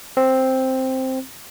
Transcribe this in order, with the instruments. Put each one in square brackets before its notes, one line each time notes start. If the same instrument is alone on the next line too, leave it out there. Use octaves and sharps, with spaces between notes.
[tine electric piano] C4